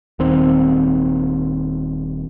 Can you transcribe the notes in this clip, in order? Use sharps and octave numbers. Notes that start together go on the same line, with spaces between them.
D#1 D#3 C4